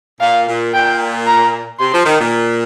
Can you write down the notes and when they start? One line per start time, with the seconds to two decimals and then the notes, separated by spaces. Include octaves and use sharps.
0.21 A#2 F5
0.48 A#2
0.74 A#2 G5
1.27 A#5
1.80 C3 C6
1.93 F3
2.06 D#3
2.20 A#2